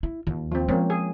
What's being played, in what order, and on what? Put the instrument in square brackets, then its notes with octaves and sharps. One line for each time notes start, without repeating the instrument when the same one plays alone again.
[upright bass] E4
D#2 F4
[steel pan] F3 C4
[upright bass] F3 G#3 [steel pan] A#3 C4 C#4
[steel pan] G#4